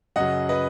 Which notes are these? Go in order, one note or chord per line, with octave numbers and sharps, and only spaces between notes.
F#2 C#3 F#3 D#5 F#5
B4 D#5